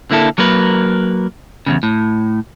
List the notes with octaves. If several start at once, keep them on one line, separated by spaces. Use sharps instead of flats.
D3 A#3 E4 A4
F#3 A#3 A#4 B4
E2 G#2 C#3
A2